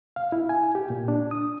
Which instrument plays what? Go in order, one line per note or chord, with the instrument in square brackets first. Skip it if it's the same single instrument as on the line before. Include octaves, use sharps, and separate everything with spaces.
[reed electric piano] F5
E4
G#5
G4
A#2
D4
D#6